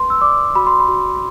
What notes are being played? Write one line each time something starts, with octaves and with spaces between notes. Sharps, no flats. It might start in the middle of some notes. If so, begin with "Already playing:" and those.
Already playing: B4 C6
E6
D5 D6
F#4 B5
C6
B5
F#4